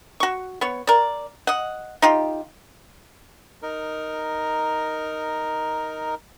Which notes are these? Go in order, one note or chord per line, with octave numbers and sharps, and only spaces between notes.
F#4 C#6
B3 C#5
A#4 D5
D#5 F#5
D#4 F4 G4
D#4 A#4